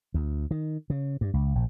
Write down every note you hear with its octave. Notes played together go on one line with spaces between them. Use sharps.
D2
D#3
C#3
G2
C#2
A#1